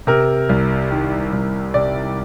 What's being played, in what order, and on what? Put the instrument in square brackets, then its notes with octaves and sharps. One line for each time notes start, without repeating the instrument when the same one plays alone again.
[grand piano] C3 A#4
C2
D#3
C2
C3 D5